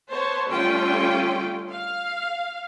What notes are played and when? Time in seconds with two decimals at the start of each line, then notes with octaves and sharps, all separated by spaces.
0.10 B3 C5 C#5 A5
0.48 D3 G3 A3 C#4 F4 G5
1.71 F5